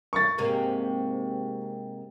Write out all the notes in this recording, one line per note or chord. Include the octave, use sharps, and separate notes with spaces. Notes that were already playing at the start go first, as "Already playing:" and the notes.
C#6 A6
G#2 C3 A#3